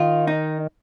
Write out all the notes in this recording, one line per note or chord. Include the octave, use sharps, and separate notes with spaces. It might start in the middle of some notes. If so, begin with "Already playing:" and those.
Already playing: D#3 F4
D#4